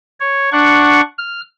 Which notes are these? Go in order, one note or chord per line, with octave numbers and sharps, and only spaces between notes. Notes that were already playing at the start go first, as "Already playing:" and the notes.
C#5
D4 F#5 C#6
F6